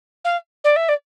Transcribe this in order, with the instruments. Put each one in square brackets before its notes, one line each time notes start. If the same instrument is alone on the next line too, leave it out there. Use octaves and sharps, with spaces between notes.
[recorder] F5
D5
E5
D5